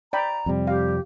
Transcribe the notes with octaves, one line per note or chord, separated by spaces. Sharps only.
D5 G5 A#5 B5
F2 C3 G3
G4 F5